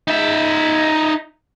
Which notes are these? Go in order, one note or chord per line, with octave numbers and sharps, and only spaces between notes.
D#4 E5